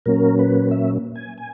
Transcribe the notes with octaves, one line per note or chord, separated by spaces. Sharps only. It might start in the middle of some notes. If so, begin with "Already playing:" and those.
A#2 F#3 A#3 C#4 A#4
B4
E5
G#5
G#5